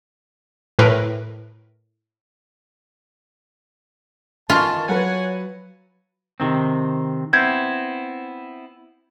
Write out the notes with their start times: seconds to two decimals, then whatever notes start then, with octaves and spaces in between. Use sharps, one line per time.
0.79 A2 A#4 B4
4.50 D#3 E3 F4 G#5 A5 C#6 A6
4.88 F#3 B4 C#5 F#5 G#5
6.40 C3 D#3 C4
7.33 B3 C4 E4 G6 G#6